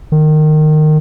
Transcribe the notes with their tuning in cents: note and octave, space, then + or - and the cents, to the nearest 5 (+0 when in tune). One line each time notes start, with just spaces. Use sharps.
D#3 -20